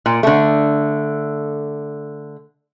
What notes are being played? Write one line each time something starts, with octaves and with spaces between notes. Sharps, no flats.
A#2
D3 A3